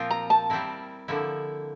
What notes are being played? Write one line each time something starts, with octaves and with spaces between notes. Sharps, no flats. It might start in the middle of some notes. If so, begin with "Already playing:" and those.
Already playing: A#2 F3 C4 F4 A#4
A#5
A5
G3 C4 E4 A#4
D3 F3 A#3 E4